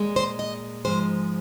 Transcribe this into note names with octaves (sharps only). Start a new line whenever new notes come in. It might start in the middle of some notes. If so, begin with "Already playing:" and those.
Already playing: A#2 G#3
C5
D#5
G#2 F3 G#3 C5